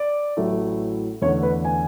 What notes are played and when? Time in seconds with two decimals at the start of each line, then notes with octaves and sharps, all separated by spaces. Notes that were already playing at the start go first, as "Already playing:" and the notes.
Already playing: D5
0.37 A1 A2 F#3 A3 E4
1.22 E2 D3 A3 C#5
1.43 B4
1.64 G#5